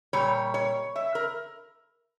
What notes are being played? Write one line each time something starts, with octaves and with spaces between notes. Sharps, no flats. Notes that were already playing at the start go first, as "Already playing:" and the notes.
A#2 G3 C#5
C#5
E5
A#4